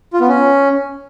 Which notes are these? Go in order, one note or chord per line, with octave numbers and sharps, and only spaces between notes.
F4
B3
C#4